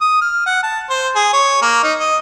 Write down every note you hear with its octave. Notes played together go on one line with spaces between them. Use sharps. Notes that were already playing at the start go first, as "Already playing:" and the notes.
D#6
F6
F#5
A5
C5
G#4
C#5
A#3
D#4
D#5